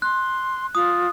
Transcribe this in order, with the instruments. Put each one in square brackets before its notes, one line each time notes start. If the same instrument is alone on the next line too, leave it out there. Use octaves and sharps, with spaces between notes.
[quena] C6 [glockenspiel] F#6
[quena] F4 [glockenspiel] D#6